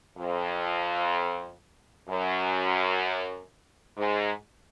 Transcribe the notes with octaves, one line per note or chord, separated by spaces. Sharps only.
F2
F#2
G#2